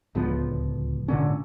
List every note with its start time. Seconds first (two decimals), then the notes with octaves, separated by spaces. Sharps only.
0.15 D1 C#2 F3 B3
1.08 G#1 A#2 D3 C#4